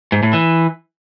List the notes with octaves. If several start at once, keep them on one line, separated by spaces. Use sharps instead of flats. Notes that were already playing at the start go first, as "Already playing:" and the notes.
G#2
A2
E3